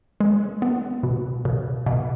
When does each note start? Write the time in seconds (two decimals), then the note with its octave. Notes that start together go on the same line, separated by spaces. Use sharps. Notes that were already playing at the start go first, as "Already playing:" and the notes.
0.20 G#3
0.62 B3
1.03 B2
1.45 B2
1.86 B2